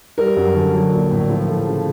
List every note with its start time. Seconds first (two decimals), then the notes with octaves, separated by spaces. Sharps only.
0.18 G3 A#4
0.36 F#2
0.55 D3
0.74 F#3
0.93 A#1
1.11 A2
1.30 F3
1.48 A3
1.67 C#3